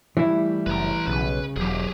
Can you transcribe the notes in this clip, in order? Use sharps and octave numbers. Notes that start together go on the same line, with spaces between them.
E3 G3 A3 E4
F#1 B4 A#5
B1 C#3 B4
E1 D#3 F#3 G4 G#4